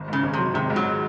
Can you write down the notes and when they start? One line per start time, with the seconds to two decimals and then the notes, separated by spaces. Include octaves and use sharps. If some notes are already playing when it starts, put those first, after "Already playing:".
Already playing: G#1
0.08 G#2 C#3
0.23 G#1
0.33 C3 F#3
0.54 G#1 C3
0.70 G#2
0.76 F#3